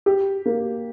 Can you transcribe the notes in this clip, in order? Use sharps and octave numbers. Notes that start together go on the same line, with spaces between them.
G4
A#3